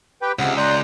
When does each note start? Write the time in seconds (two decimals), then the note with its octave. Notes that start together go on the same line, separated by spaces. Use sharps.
0.22 G4 B4 G5
0.39 C#2 G#2 C3 F#5
0.57 D5 A#5 C6 F#6 G6